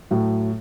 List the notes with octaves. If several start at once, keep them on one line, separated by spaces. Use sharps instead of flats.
A2 F#3